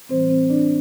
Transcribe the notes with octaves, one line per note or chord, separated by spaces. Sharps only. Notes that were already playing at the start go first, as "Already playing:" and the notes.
A2 E3 G3 C4 C5
C4 C5
D4 D5